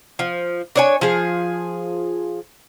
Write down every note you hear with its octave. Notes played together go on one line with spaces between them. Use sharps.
F3
D4 C#5 G#5
F3 G#4